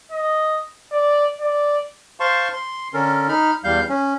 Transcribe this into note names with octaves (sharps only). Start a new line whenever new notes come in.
D#5
D5
D5
C5 F5 A5 C6 C#6
C6
D3 C#4 A4 A#4
D#4 B5 F6
E2 G3 F5 G6
C#4